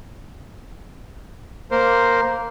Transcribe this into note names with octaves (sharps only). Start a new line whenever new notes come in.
A#3 A#4 C5